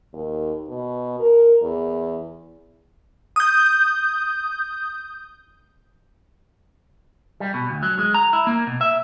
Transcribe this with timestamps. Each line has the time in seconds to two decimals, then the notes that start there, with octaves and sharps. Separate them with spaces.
0.13 D#2
0.68 B2
1.20 A#4
1.62 E2
3.36 D#6 G6
7.40 G3
7.54 B2
7.70 D2
7.83 F#3
7.99 G#3
8.14 A#5
8.33 E4
8.47 A#3
8.67 B2
8.81 E5